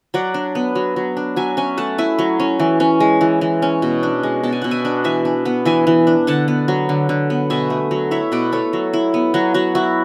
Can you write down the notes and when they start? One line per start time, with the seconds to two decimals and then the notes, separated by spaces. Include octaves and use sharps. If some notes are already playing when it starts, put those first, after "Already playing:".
0.14 F#3 D5 F#5
0.34 D4
0.55 B3
0.75 F#3
0.96 F#3
1.17 D4
1.36 F#3 E5 G#5
1.57 C#4 E5 G#5
1.77 A3 F#5 A5
1.98 E4 E5 G#5
2.19 F#3
2.40 C#4
2.60 E3
2.80 C#4
3.00 G#3
3.21 E3
3.41 E3
3.62 C#4
3.82 B2
4.03 D4
4.23 G#3
4.44 B2 A5
4.52 G#5
4.62 B2 F#5
4.71 E5 G#5
4.85 D4
5.04 E3 E5 G#5
5.25 D4
5.45 B3
5.65 E3 E5 G#5
5.87 E3
6.07 D4
6.27 D3 F#5 A5
6.48 B3
6.68 F#3
6.89 D3
7.09 D3
7.30 B3
7.50 B2 E5 G#5
7.70 A3
7.91 F#3
8.11 E4 C#5 E5
8.32 B2 B4 D5
8.52 A3 A4 C#5
8.73 F#3
8.93 E4
9.14 B3
9.34 F#3 F#4
9.54 F#3 F#4
9.75 E4 F#4